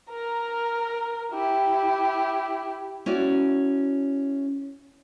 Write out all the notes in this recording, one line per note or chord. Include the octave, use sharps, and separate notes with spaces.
A#4 A#5
E4 G4
C#4 E4 F#4 D5